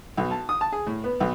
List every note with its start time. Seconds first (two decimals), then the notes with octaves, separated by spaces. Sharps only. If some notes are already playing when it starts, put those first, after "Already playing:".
0.18 B1
0.31 A5
0.49 D#6
0.61 A5
0.73 G#4
0.87 A2
1.04 B3
1.20 B1